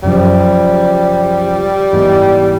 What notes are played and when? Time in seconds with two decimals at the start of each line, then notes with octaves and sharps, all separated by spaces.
0.03 F#2 C#3 F3 G3
1.92 G#2 E3 G#3 B3